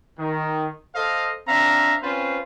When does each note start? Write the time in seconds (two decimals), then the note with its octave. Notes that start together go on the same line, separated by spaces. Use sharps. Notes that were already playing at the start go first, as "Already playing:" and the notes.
0.18 D#3
0.95 A4 C5 D#5 F5
1.48 C4 D4 E5 F5 A#5
2.02 C4 C#4 F4 B4 C5